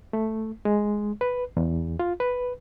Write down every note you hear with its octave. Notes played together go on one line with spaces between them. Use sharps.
A3
G#3
B4
E2
F4
B4